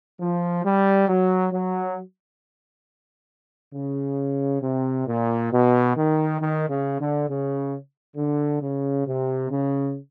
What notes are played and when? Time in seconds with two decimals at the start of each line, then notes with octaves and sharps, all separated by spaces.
0.19 F3
0.64 G3
1.08 F#3
1.52 F#3
3.73 C#3
4.63 C3
5.07 A#2
5.51 B2
5.96 D#3
6.40 D#3
6.68 C#3
6.98 D3
7.29 C#3
8.17 D3
8.60 C#3
9.06 C3
9.50 C#3